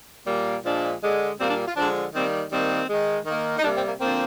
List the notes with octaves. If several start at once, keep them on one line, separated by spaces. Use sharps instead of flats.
A#2 G3 A#3
A#2 F3 G#3 D4
D3 G#3
A#2 G3 A#3 C4
D4
F4
D3 F3 G#3 D4
D#3 G3 A#3 C4
D#3 G3 A#3 C4
D#3 G#3
D#3 A#3
D#4
C3 G3 A#3 D4
C4
A#3
D3 F3 A#3 C4